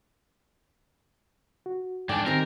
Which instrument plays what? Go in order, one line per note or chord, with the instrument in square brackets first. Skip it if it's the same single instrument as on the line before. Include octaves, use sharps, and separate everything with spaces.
[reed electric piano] F#4
[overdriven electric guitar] G#2 D4 [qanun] A4 [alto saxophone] D5 [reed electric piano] G5 G#5
[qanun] D#3 G3 [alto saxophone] C4 [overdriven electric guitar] A#4